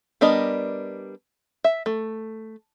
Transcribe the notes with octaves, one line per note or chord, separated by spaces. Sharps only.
G3 B3 D4 A#4 D#5
E5
A3